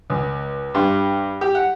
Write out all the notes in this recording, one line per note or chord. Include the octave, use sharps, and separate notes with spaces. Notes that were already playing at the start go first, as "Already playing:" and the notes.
C#2
G2
G4
F#5